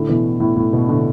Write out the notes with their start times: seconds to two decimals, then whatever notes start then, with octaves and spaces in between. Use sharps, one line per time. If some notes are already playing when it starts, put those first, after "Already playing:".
Already playing: A2 D3
0.09 B2 E3
0.40 A2
0.56 A2
0.73 B2
0.88 A2 D3